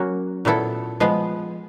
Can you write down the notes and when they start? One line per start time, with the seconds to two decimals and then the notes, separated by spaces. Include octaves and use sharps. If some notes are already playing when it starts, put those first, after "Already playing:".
Already playing: F#3 A#3 C#4 F#4
0.45 A#2 F#3 B3 E4 A4
1.00 F3 G#3 B3